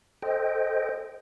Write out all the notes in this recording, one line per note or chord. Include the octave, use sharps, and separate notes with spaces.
A4 C5 D#5 G5